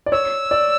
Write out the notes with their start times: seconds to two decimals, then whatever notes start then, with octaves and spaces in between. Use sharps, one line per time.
0.06 D5
0.12 C#5 E6
0.51 D5